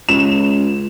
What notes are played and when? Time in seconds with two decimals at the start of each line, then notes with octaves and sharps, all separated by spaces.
0.09 C#2 E7